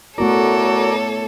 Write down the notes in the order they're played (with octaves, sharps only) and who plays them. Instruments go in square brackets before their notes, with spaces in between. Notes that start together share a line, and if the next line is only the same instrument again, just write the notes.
[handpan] A3 B3 E4 [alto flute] F#4 [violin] A4 C#5 [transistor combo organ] A#4 D5